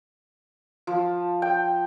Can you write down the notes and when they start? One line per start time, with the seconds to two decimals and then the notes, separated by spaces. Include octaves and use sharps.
0.87 F3
1.42 G5